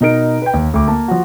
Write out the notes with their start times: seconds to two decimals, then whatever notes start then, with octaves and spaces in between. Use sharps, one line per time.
0.01 B2 D#4 A#4 D7
0.42 B4 G5
0.54 D#2
0.74 D2 D6
0.88 A#3 A5
1.08 F3 F#4